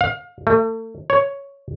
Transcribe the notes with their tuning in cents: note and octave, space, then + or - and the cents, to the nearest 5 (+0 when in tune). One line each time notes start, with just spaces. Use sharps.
F5 +30
A3 +35
C#5 +5